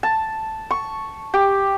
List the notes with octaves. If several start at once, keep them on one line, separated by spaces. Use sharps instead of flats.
A5
C#6
G4